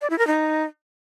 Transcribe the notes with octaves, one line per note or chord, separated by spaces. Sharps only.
D5
E4
A#4
D#4